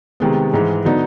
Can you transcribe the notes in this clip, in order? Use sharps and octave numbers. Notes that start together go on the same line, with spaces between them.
C3 D#3 G#3 B3
G#2 E3 G#3
D3 F#3 B3 D#4